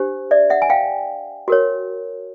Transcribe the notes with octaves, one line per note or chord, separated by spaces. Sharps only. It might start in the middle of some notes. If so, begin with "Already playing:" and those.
Already playing: D4 G4 C5
D5 E5
E5 F#5
G#5
F5 G5
F#4 A#4 C#5